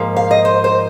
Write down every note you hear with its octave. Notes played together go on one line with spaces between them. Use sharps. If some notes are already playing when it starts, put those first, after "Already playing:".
Already playing: G#2 F3 A#3
F5
D#5
C5
C5